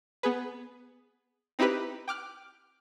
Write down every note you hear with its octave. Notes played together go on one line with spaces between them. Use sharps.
B3 G#4 B4
C4 D#4 E4 G4 B4
G5 D6 F6 F#6